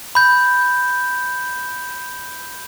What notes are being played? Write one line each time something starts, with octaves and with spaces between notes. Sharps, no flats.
B5 G6